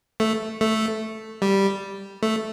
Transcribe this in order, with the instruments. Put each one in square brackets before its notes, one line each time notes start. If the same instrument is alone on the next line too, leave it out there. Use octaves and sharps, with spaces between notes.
[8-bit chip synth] A3
A3
G3
A3